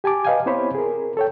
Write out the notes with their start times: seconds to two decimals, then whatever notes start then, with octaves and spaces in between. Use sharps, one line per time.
0.04 G4 G#5 A5 D6
0.25 B4 D#5 F5 G5 G#5
0.46 B3 C4 E4 C5 C#5 B5
0.75 G#4 A#4
1.17 A4 C#5 G5